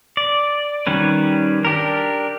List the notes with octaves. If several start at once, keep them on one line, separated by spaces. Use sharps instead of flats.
D5
D#3 G3 C#4 B4
D4 G4 A#4